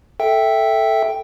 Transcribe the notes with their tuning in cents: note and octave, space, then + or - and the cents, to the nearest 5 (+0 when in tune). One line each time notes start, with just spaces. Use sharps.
A4 +0 E5 +0 G5 +0